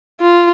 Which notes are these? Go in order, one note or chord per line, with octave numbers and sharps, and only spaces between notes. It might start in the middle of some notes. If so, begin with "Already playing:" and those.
F4